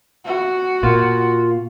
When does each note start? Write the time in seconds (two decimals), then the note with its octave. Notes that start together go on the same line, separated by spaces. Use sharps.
0.25 F#4
0.83 A#2 A#3 F4